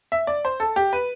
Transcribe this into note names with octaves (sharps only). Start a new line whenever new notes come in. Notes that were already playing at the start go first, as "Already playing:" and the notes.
E5
D5
C5
A4
G4
B4